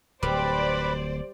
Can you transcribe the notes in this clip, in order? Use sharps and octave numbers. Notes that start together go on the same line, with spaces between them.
D1 G3 B4 C5 D5 B5 D6